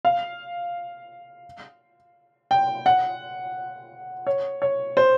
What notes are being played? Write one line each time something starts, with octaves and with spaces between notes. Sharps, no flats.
F5
G5
F#5
C#5
C#5
C5